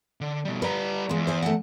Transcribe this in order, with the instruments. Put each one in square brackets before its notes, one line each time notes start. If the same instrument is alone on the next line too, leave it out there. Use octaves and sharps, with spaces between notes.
[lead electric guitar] D3
B2 G3
[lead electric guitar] G3 A#5 [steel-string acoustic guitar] B4
[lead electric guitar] E2 [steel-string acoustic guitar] G#3 F4
[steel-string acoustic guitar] C5 G#5
A3 F#5